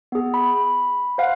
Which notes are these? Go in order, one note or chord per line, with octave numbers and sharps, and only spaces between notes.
B3 G#4
B5
C5 F5 F#5